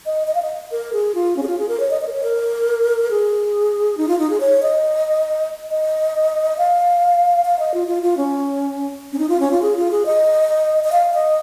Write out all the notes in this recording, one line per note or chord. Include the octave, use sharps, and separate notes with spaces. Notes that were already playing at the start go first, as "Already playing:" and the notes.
D#5
D#5
F5
D#5
A#4
G#4
F4
C#4
G#4
F4
G#4
A#4
C#5
D#5
D#5
A#4
C#5
A#4
G#4
D#4
F4
D#4
G#4
C#5
D#5
D#5
F5
F5
D#5
F4
F4
F4
C#4
C#4
D#4
F4
C#4
F4
G#4
F4
G#4
D#5
D#5
F5
D#5